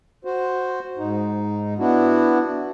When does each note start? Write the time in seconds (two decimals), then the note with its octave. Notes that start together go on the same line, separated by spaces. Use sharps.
0.25 F#4 C5
0.98 G#2 D#4
1.79 B3 D4 E4 F#4